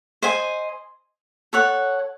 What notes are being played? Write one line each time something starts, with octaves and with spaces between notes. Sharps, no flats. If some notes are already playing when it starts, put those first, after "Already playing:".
C5 D#5 G#5
A4 C#5 F#5